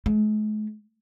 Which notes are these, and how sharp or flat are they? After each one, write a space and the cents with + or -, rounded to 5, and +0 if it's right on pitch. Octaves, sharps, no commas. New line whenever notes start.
G#3 +45